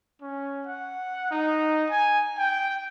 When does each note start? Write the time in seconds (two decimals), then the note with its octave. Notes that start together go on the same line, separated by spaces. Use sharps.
0.21 C#4
0.66 F#5
1.31 D#4
1.90 G#5
2.38 G5